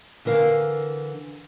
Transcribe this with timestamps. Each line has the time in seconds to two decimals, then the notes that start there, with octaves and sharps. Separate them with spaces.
0.25 D3 E3 A#4 F5